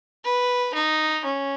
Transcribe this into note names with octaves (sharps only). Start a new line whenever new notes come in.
B4
D#4
C#4